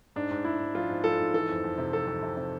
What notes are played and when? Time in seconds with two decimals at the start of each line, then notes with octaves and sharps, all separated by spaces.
0.16 G#2 D4
0.31 G#2
0.45 G#2 E4
0.59 G#2
0.75 F3 F4
0.90 G#2
1.04 F3 A4
1.19 G#2
1.34 E3 A4
1.49 F2
1.64 F2
1.78 C3
1.93 F2 A4
2.07 F2
2.23 C3
2.37 C3